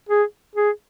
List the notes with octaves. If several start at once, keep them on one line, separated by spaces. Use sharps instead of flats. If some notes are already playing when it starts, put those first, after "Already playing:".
G#4
G#4